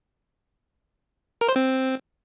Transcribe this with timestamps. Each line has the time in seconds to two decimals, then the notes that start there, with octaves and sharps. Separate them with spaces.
1.41 A#4
1.48 C5
1.56 C4